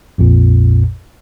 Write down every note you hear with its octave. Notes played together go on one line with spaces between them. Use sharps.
A#1 F2 A#2